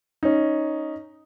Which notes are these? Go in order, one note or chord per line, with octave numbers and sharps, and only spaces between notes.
C#4 D#4